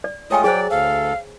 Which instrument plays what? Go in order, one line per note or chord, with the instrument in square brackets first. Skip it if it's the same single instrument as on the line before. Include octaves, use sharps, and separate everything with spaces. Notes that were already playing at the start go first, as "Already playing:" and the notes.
[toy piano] D5
[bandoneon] G#3 A3 F4 [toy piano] C#5 G5 G#5 [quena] D#6
[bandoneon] F#3 D5 [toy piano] G#4 C5 [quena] G5
[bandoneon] D2 A4 [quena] F5